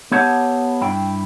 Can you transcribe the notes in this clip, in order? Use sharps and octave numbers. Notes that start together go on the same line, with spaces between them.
B3 G4 C#5 E5 F#5 A5
G2 E4 G5